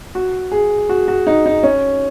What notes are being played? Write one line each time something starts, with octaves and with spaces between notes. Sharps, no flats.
F#4
G#4
F#4
F#4
D#4
D#4
C#4